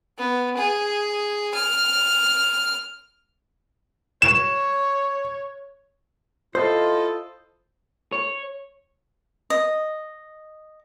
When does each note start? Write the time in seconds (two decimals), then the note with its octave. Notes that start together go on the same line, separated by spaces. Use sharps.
0.18 B3
0.57 G#4
1.55 F6
4.22 C#5 E7
6.55 E4 F4 A4 C5 D#5
8.12 C#5
9.50 D#5